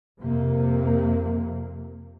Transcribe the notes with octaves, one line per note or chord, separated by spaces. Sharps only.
F2 C3 A#3